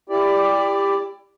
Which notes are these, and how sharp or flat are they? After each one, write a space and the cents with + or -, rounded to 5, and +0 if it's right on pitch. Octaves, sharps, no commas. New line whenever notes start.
E4 +15 G4 +20 D5 +0